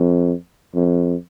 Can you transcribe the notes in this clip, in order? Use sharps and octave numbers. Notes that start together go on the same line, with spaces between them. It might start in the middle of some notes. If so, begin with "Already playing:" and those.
Already playing: F2
F2